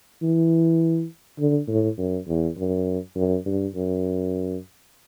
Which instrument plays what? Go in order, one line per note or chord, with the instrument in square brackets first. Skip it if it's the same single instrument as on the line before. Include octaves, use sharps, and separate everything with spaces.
[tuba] E3
D3
A2
F#2
E2
F#2
F#2
G2
F#2